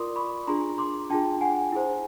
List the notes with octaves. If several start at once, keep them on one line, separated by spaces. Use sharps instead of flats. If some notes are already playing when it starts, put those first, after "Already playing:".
Already playing: F4 A#4 D5 C6 D6 D#6
B5 C#6
D4 F4 G#4 A#5 C6
C6 D6
D4 F4 G#4 G5 A5
F#5 G#5
E4 G#4 C5